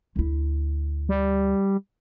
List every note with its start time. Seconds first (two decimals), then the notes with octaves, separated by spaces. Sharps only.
0.16 D2 E4
1.09 G3